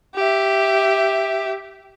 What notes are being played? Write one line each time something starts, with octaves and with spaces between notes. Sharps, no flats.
G4 E5